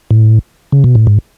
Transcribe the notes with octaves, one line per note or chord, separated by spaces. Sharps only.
A2
C#3
B2
A2
G#2